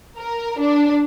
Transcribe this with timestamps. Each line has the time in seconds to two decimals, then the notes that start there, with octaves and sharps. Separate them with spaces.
0.17 A#4
0.59 D4